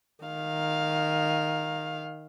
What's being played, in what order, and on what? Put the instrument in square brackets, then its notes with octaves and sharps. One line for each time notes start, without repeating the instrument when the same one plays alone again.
[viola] D#3 F5